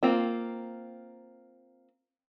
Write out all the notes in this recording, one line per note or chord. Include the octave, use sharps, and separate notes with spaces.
A#3 C4 F4